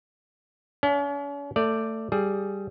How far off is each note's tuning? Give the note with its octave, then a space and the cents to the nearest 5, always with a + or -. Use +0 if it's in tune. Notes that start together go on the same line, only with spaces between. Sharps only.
C#4 +40 E5 +35
A3 +20 D5 +0
G3 +0 G#4 +10